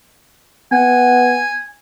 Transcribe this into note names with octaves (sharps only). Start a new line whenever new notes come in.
B3 F#5 G#5